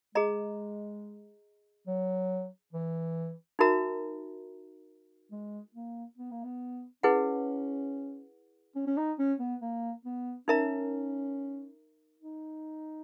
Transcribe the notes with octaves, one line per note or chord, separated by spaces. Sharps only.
G#3 G#4 D#5 A#5
F#3
E3
D#4 F#4 A#4 E5 A#5
G#3
A#3
B3
A#3
B3
C#4 E4 G#4 B4 F#5
C#4
C#4
D#4
C#4
B3
A#3
B3
C#4 D#4 A#4 E5 A#5
D#4